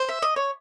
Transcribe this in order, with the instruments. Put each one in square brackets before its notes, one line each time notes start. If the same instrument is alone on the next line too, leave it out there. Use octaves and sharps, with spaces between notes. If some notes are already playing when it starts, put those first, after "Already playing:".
Already playing: [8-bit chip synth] C5
[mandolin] E5
D#5
C#5